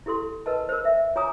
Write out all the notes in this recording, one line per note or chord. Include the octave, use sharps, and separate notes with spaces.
E4 G4 A4 C6
A#4 B4 D#5 A5
A#4 C5
E5
F4 C#5 G#5 A#5 D6 D#6